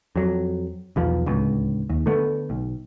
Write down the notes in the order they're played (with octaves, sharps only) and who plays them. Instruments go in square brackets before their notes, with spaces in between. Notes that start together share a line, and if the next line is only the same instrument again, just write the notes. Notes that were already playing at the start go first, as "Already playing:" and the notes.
[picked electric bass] F2 F#3
B1 E2 F3
D1 C#2
D#2
D3 A3 B3
B1